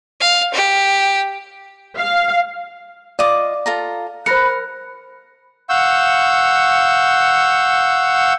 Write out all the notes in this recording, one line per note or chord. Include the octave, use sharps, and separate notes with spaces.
F5
G4
F5
F4 D5 D#5 D6
F4 A4 A#5
A#4 C5 B5 F#6 A#6 C#7
F5 F#5 C#6 E6 G6